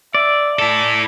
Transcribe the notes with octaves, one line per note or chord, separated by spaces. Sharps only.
D5 E5
E4 A4 A5